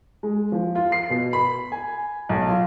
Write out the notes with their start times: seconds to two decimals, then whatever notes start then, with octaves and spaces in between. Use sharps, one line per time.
0.23 G#3
0.52 F3
0.75 F4
0.92 C7
1.10 B2
1.33 B5
1.72 G#5
2.29 B1
2.49 F4